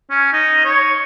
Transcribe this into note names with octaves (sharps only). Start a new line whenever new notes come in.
C#4
D#4
C#5